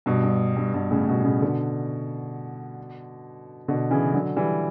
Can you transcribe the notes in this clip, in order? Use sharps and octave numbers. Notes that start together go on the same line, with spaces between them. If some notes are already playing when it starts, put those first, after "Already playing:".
G2 B2
G2
G2
G2 B2
A2 C#3
G2 B2
A2 C#3
B2 D3
B2 D3
C#3 E3
D3 F#3
E3 G3